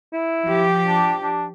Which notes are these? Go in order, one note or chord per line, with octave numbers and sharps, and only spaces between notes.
E4
F3 G4
D4
D4